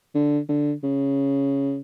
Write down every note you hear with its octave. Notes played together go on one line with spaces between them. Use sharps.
D3
D3
C#3